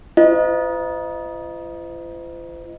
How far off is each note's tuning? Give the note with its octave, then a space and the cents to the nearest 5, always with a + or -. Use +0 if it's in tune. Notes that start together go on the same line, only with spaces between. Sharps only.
F4 -40 C5 -40 D#5 +0